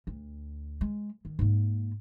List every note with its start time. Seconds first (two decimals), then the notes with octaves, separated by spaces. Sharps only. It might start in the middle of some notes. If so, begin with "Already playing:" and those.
0.07 D2
0.81 G#3
1.25 D#3
1.39 G#2 A#3